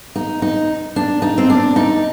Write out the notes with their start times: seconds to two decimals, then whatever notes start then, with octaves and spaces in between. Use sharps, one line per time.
0.15 D#4
0.42 D#4
0.96 D4
1.22 D#4
1.38 C4
1.50 D4
1.76 D#4